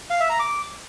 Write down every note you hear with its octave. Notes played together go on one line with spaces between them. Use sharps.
F5
E5
A#5
D6